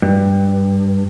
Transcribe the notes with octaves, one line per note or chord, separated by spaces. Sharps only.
G2